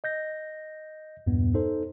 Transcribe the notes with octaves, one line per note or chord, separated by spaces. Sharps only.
D#5 G6 A#6
E2 G2 A#2 B3
D#4 A4 C5